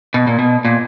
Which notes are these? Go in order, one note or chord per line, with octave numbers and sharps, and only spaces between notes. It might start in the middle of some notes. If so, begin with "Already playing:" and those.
B2
A#2
B2
A#2